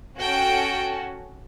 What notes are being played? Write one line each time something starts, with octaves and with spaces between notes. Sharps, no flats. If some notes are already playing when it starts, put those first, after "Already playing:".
C#4 F#4 A4 G5